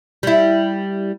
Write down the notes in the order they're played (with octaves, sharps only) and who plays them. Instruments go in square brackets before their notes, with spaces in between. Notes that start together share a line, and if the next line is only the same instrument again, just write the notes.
[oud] G3 E4